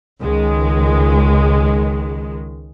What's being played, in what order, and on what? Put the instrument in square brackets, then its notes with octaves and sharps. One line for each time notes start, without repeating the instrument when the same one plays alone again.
[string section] C#2 D#3 G#3